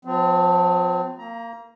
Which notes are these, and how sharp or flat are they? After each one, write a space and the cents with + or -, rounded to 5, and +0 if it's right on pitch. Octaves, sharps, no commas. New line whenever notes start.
F3 +35 C4 -30
A#3 -20 A#5 +20